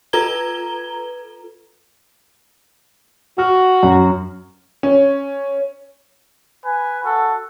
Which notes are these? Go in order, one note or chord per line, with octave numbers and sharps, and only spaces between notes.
F4 A4 B4 A#5 G#6 G7
F#4 F6
F#2
C#4
B4 G#5
F#4 A4